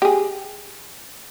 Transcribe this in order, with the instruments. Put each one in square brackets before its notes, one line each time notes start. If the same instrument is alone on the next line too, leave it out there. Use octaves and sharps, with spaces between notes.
[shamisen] G4 G#4